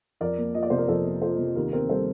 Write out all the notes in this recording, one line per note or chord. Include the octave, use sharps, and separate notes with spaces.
F2 A#4 D5
A#3
F3 D#5
D5
C3 C5
A#4 D5
F2 A4 C5
A#3
F3 A4 C5
C3
D#2 A#4
C4 A#4
G3 A4 C5